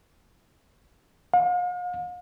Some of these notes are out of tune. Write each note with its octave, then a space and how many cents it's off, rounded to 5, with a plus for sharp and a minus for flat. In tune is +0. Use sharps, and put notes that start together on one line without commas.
F5 +45